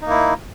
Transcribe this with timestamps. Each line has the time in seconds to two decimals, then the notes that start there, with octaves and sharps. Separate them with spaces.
0.01 D#4
0.06 A#3
0.10 E4